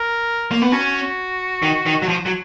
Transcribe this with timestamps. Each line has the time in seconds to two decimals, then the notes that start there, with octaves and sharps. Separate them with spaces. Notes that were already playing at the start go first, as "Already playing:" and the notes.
Already playing: A#4
0.51 A#3
0.62 B3
0.72 C#4 F#4
1.62 D#3
1.86 D#3
2.02 F#3
2.08 F3
2.26 F#3